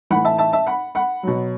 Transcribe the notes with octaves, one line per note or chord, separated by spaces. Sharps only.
A2 E3 F#5 B5
E5 A5
E5 A5
E5 A5
F#5 B5
F#5 B5
B2 F#3